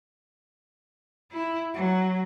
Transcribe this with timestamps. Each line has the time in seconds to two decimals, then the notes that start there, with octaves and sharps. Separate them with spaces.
1.31 E4
1.74 F#3